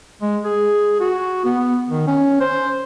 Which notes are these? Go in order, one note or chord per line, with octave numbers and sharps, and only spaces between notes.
G#3
G#4
F#4
B3
D#3
C#4
C5